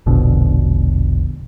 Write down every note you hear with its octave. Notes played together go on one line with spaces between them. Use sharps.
E1 A#1 B2 D3